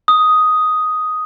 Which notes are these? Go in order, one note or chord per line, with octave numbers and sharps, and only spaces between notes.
D#6